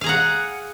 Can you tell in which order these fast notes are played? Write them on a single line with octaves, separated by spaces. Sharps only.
F5 G#4 A#5 F#5